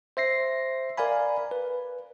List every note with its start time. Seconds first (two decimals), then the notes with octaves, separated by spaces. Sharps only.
0.17 C5 E5 A#6 C7
0.97 A#4 D5 F5 G#5 B5
1.51 B4